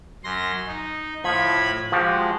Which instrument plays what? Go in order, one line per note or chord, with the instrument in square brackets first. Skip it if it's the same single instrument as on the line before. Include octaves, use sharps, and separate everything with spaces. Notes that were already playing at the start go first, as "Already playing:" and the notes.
[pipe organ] F#2 C6 A#6
D#4
[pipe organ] A2 B5 G#6 [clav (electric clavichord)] F3
[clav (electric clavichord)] F3 F#4 G4 [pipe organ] G#3